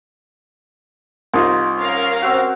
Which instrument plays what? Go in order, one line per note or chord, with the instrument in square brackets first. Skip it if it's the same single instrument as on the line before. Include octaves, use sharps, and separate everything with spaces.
[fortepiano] C2 D#4 F4 [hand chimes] C6 D#6
[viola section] C#4 A#4 F5
[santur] C4 F#4